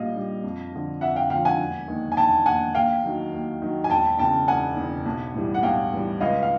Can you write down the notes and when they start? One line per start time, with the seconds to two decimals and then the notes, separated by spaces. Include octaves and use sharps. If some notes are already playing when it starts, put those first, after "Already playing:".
Already playing: A#1 A#2 G3 D#5 F5
0.15 A#2 G3
0.44 F2
0.73 D3 F3
1.01 F2 E5 F#5
1.16 F5 G5
1.30 D3 F3 F5 G5
1.45 F#5 G#5
1.60 E1
1.88 D#2 D#3
2.12 G#5
2.17 E1 G5 A5
2.46 D#2 D#3 F#5 G#5
2.75 D#2 F5 G5
3.03 D#3 F#3
3.33 D#2
3.62 D#3 F#3
3.84 G#5
3.90 E1 G5 A5
4.19 E2 C#3 G5 A5
4.47 E1 F#5 G#5
4.76 E2 C#3
5.06 B1
5.34 A2 E3 G3
5.54 F#5
5.63 B1 F5 G5
5.92 A2 E3 G3
6.20 C#2 D#5 F5
6.43 F5